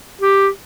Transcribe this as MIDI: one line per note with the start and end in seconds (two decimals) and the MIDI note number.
0.22 0.47 67